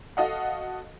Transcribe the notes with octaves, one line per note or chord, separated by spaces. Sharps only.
F#4 A4 D#5 F5 F#5